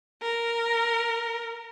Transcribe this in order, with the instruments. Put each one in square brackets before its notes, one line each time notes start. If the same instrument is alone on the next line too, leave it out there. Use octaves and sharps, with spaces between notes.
[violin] A#4